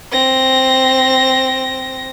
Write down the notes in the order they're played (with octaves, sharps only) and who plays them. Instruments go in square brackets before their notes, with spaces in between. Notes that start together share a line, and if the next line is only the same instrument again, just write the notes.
[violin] C4 A#6